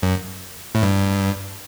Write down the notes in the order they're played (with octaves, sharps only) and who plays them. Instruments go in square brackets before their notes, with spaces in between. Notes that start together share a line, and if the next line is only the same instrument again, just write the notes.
[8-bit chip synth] F#2
A2
G2